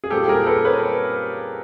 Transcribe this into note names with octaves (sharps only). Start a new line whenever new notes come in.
G#4
A#2 G3 C4 G4 A4
G#4 A#4
A4 B4
B4 C#5